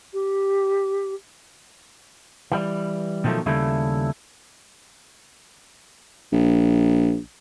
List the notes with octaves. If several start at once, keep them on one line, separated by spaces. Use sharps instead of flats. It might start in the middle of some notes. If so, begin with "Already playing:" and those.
G4
E3 G3
B2 D#3 F3 F#3 A3
D#2 C#3 G3 A3 E4
A#1